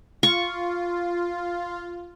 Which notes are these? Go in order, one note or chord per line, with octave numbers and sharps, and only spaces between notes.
F4 C#6